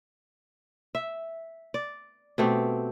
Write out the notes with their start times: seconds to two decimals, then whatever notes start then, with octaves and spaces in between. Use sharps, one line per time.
0.95 E5
1.74 D5
2.38 B2 A3 C4 G4